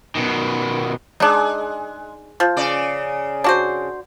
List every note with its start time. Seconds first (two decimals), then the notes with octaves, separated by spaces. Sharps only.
0.15 B2 D#3
1.20 G#3 D4 D#4
2.40 F3
2.57 C#3 D5
3.44 D4 F#4 C5